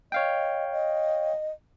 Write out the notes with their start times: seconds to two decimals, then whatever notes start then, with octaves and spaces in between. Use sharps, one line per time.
0.12 C#5 D#5 F5 G5
0.72 D#5